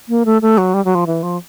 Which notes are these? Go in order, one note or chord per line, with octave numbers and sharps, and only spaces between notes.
A#3
A3
A3
F#3
G3
F#3
F3
E3
F3